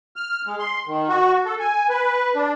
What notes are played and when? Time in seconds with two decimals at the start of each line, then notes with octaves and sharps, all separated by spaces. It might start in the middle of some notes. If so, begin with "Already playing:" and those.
0.16 F6
0.47 G#3
0.59 C6
0.87 D#3
1.09 F#4
1.45 A4
1.60 G#5
1.89 B4
2.35 D4